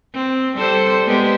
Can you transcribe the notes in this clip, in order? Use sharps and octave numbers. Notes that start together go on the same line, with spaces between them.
C4
G3 A4 C5
G#3 B3 G4